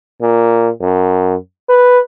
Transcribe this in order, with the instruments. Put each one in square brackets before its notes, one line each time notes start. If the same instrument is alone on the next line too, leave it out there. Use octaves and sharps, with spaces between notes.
[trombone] A#2
F#2
B4